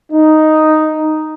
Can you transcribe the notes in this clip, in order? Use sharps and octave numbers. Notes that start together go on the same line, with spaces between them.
D#4